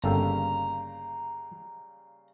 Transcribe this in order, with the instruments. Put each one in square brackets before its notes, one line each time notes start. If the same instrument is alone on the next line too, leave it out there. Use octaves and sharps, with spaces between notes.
[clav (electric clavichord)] G1 A4 G5 [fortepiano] C#3 G3 A#3 [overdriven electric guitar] A#5